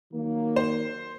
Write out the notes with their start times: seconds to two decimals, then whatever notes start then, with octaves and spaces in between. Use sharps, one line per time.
0.13 D#3 F#3 A#3
0.56 C5